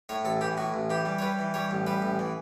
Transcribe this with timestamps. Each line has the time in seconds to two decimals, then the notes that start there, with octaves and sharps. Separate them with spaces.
0.09 A2 C#5
0.25 A1 A4
0.41 E3 G4
0.57 A2 F#4
0.74 A1
0.90 E3 G4
1.05 G3
1.19 C#5
1.22 G3 B4
1.39 E3
1.54 G3 C#5
1.71 A1
1.87 G3 B4
2.02 A1
2.19 E3